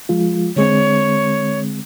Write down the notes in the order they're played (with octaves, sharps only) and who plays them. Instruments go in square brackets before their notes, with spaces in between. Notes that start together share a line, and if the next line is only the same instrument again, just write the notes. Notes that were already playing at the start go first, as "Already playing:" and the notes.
[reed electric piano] F3 G#3 F4
[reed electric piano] D3 G#3 C4 [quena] C#5